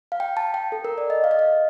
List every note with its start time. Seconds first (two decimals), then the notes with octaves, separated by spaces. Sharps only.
0.12 F5
0.20 G5
0.37 A5
0.54 G5
0.72 A4
0.84 A#4
0.98 D5
1.10 D#5
1.24 F5
1.31 D#5
1.39 F5